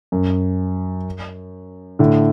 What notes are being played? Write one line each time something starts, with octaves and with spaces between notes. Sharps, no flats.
F#2
A2 D3